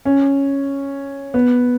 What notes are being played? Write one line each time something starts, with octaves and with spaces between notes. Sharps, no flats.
C#4
B3